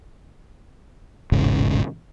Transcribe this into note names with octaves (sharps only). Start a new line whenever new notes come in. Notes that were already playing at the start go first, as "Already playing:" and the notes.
E1 A1 G#2 C#3